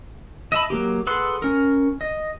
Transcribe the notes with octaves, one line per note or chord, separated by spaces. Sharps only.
D#5 E5 A5 B5
F#3 A#3 G4
G#4 A4 B4 F#5 C6
C#4 A#4
D#5